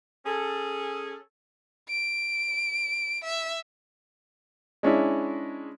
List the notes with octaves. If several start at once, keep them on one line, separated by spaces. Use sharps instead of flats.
C#4 G#4 A4
D7
E5
G#3 C#4 D4 E4